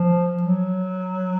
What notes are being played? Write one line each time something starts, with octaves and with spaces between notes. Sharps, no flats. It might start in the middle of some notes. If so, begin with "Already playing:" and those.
Already playing: F3
F#3